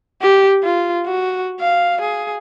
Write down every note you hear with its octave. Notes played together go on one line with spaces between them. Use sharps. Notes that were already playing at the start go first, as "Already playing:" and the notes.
G4
F4
F#4
F5
G#4